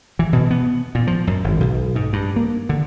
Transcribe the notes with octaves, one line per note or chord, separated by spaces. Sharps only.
E3
B2
B3
A#2
F3
F#2
G#1
B1
G#2
G2
A#3
D3